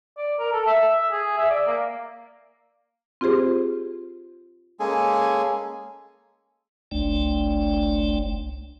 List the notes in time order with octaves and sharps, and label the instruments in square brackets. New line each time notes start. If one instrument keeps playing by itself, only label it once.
[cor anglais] D5
A#4
A4
E5
G#4
E5
D5
A#3
[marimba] C4 F4 G4 G#4 C5
[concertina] G#3 A#3 C#4 G#4 A4 G#5
[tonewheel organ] F#1 C2 A3 D4 D5 G5